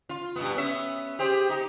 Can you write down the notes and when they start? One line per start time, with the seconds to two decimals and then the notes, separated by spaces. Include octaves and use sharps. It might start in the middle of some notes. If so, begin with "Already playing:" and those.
0.09 F4
0.36 G2 B2 B3
0.55 B3 C#4 E5
1.19 G4 G#4 C5
1.49 D#4 G4